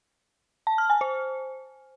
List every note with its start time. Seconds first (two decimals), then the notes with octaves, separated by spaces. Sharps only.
0.67 A5
0.78 F6
0.90 G#5
1.01 C5